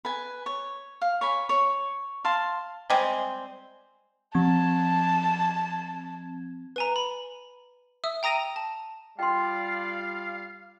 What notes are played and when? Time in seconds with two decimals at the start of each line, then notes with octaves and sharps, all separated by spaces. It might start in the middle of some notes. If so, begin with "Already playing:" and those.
0.05 B4 G#5
0.46 C#5
1.01 F5
1.21 C#5 G#5 B5
1.49 C#5
2.24 F5 A5 C6
2.90 G3 G#3 C4
4.35 F3 C4 A5 G#6
6.76 B4 G#5 A#5
6.96 B5
8.04 E5 D#6 E6
8.23 G5 A#5 D#6 A#6 D#7 F7
8.56 A5
9.19 G3 F4 D5 F5 G5 C6